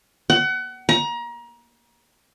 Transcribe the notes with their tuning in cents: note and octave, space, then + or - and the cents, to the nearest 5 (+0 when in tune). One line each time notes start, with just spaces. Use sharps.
F#5 +30
A#5 +30